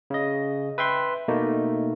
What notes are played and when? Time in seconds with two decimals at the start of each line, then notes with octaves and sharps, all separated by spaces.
0.10 C#3 D#5
0.78 B4 E5 G5 C6
1.28 B2 A3 A#3 D#4